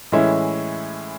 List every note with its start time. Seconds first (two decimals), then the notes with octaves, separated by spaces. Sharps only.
0.12 A2 E3 G#3 C#4 E4